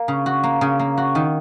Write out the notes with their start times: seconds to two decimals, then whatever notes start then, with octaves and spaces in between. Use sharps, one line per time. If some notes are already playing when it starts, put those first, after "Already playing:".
Already playing: A#3
0.08 C#3
0.26 F#4
0.44 A#3
0.61 C#3
0.79 A#3
0.97 F#4
1.15 D#3